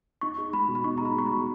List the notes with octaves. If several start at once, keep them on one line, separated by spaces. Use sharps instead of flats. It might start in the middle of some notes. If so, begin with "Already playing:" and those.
D#4 C#6
G#4
G#3 B5
B2
B5
D#4 C#6
A#5
G#4 B5
G#3 C#6
B5
B2